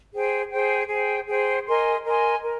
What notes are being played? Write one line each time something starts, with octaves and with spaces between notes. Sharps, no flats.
G#4 C5 G5
G#4 C5 G5
G#4 C5 G5
G#4 C5 G5
A#4 D#5 G#5 C6
A#4 D#5 G#5 C6
A#4